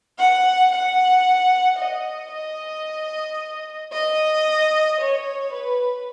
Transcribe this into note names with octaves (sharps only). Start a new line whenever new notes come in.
F#5
F#5
D#5
D#5
D#5
C#5
B4